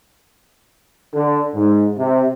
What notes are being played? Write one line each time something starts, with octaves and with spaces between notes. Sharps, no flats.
D3
G#2
C3